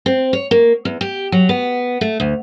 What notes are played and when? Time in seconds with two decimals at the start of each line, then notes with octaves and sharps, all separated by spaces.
0.06 C4
0.33 C#5
0.51 A#3
0.85 E2
1.01 G4
1.32 F#3
1.49 B3
2.01 A3
2.20 D2